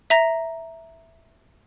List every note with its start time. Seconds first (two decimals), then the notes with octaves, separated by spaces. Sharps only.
0.10 E5 A#5 A#6